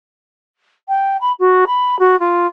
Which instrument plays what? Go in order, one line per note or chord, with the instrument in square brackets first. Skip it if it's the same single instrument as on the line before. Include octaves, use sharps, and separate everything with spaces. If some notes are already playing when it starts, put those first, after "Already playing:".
[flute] G5
B5
F#4
B5
F#4
F4